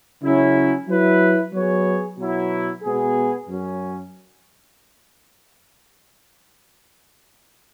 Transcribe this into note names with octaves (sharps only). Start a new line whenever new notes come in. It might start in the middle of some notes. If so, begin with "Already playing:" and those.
C#3 F#3 C#4 E4
F#3 E4 B4
F#3 B3 G#4 C#5
B2 F#3 E4
B2 G#3 B3 G#4
F#2 F#3 C#4